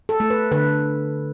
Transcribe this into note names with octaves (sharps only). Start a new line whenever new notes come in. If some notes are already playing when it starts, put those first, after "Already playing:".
A4
A3
B4
D3 B4